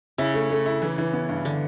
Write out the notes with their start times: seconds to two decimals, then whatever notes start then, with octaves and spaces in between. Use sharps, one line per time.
0.18 C#3 E4
0.34 A3
0.50 A3
0.66 E4
0.82 E3
0.98 E3
1.13 B3
1.29 G2
1.45 D3